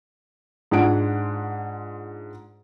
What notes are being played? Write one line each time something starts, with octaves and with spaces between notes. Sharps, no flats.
G#2 D4 F4 G#4 F#5 D7